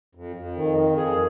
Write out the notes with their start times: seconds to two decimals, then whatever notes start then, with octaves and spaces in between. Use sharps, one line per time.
0.15 F2
0.36 F2
0.56 D#3
0.77 F2
0.97 G#4